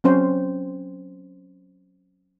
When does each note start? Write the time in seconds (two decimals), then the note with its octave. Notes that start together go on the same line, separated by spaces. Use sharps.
0.04 F#3 C4 C#4 C5